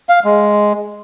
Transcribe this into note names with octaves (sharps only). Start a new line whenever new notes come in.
F5
G#3